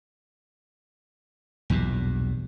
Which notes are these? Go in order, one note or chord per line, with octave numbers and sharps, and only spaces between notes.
B1 E2 G2 A#2